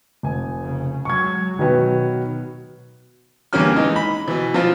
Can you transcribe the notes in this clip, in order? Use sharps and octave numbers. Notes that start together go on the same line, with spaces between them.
F1 G#5
C#3
F#3 G#3 C#6 G#6
B2 D#3 F#3 B3
E2 D3 G3 A#3 C#4 F6
E3 G#3 D#4
B5
B2 E3
F3 F#3 F4